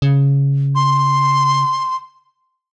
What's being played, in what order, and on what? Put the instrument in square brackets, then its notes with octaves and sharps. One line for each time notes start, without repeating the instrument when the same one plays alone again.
[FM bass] C#3
[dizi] C6